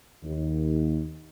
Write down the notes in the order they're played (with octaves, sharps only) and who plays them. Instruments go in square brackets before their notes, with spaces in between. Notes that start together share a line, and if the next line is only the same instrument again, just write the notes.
[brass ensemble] D#2